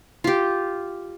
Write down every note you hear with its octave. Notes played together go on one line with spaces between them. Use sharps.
F4 G4